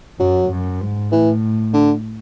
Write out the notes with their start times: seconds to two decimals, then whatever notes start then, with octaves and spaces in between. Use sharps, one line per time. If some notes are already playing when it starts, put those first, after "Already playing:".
0.19 F#2 F#3
0.50 F#2
0.81 G#2
1.11 A2 E3
1.73 D3